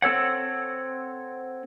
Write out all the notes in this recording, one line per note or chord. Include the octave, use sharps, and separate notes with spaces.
C4 A4 C#5 F#5